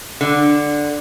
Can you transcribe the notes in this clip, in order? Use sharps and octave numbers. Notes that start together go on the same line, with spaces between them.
D3